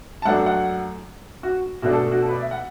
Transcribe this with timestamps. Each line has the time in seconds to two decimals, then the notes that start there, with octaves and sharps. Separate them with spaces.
0.22 A5
0.25 F#2 F#3 A3 D4 F#5
0.46 F#5
1.43 F#4
1.82 B2 A3 D4 F#4
1.93 A4
2.11 F#4
2.22 A4
2.28 B4
2.31 D5
2.42 E5
2.51 F#5